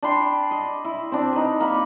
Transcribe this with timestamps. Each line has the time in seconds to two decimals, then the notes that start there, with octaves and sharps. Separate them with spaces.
0.03 D4 G5 B5 C6
0.51 D#5
0.85 E4
1.12 C4 D4
1.33 D#4 B4
1.60 A#3 F#5 B5